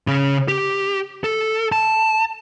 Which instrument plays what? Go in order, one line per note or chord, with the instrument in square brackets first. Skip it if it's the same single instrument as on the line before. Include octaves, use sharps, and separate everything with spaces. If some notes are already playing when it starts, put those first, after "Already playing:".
[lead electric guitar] C#3 C#4
G4
A4
A5